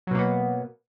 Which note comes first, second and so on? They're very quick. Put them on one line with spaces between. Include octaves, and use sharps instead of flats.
F#3 B2 A#3 B3